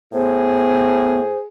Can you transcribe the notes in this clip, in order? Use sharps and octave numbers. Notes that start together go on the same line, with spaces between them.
A2 B3 G#4 C5